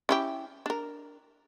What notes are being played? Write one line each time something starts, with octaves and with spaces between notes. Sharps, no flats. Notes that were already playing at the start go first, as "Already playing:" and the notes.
C#4 E4 G4
D4 A#4